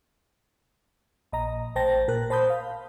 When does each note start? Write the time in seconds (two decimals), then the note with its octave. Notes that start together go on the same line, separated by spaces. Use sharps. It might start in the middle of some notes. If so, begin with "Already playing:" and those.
1.32 A#1 D#5 A#5
1.76 A1 C5 G5 A5 A#6
2.08 A#2 A#4 F#6
2.30 C5 A5 B5 D#6 G6
2.50 F5